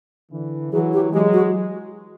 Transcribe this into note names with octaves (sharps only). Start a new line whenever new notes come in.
D3 E3
E3 F#3 G#4
G4
F#3 G#3 G4
F#4